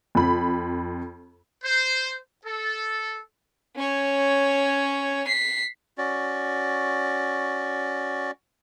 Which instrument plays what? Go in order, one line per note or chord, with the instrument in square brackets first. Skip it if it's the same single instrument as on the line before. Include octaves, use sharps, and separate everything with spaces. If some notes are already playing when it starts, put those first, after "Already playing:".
[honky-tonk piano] F2 B5
[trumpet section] C5
A4
[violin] C#4 C#5
B6 C7
[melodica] C#4 F#4 D5